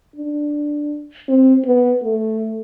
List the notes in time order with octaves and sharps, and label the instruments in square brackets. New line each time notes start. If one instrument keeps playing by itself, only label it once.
[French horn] D4
C4
B3
A3